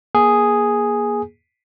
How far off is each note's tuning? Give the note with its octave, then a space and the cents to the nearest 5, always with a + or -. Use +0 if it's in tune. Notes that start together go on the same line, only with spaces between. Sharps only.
A#3 +30 G#4 +0